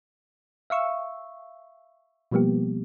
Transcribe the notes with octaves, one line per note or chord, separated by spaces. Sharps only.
E5 F5 C#6 E6
B2 F3 G3 A#3 B3 G4